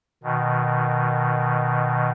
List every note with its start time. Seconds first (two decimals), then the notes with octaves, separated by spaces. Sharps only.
0.24 B2 D#3